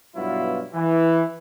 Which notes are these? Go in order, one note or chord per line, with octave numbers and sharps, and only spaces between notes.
G2 B2 F#3 B3 E4 F4
E3